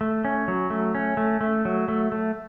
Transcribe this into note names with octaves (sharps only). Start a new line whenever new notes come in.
A3
C#4
F#3
A3
C#4
A3
A3
F#3
A3
A3